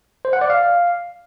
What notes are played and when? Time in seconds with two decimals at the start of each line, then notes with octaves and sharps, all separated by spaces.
0.25 C5
0.33 F#5
0.41 D5
0.50 F5